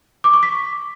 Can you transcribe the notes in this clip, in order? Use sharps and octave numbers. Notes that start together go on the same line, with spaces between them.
D6
C#6
B6